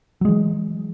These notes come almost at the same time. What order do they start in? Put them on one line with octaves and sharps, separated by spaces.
F#3 G#3 E3